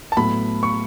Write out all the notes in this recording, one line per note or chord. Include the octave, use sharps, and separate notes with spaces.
A5
A2 F#3 B3 B5
C#6